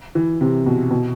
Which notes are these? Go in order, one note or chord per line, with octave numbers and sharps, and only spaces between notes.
E3
C3
B2
B2